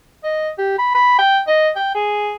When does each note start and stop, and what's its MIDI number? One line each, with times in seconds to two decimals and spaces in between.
0.24 0.49 75
0.58 0.75 67
0.78 0.90 83
0.94 1.15 83
1.19 1.39 79
1.47 1.69 75
1.76 1.91 79
1.95 2.35 68